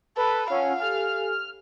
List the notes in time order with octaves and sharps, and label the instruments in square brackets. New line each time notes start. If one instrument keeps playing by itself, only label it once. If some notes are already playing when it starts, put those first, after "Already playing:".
[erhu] A4 [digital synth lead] B4 [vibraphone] B5
[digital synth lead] C#4 [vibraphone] F4 F#5 E6 [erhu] F5
[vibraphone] G4 A4 G#5 [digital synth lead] F6